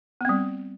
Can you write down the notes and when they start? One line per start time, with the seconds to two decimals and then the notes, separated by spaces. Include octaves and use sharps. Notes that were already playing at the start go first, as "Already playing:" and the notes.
0.21 B3
0.25 C4
0.29 G3